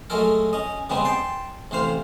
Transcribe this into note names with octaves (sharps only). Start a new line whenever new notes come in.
F#3 G#3 A3 A4 A#4
C#4 D#5
C#3 G3 G#3 B3 C4
G5 A5 C6
A1 C3 C5 F5